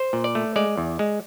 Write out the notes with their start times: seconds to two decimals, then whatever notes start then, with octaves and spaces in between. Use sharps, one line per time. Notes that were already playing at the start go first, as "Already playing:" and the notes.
Already playing: C5
0.13 A#2
0.24 D5
0.35 A3
0.56 G#3 D5
0.77 E2
0.99 G#3